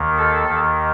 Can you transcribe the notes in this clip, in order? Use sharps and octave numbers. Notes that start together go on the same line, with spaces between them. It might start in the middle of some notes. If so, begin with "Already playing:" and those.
Already playing: D#2 D#3
A4
D#2 D#3